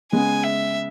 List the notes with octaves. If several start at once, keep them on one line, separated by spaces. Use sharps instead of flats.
C#3 G#3 B3 G#5
E5